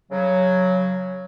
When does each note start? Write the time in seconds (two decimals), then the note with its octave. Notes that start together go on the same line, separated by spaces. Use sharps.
0.12 C#3 F#3